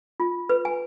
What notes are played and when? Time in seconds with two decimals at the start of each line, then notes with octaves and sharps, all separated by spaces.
0.20 F4
0.49 B4
0.65 G#5